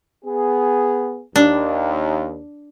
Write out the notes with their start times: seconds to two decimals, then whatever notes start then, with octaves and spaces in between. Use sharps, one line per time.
0.25 B3 G#4
1.36 D#2 D4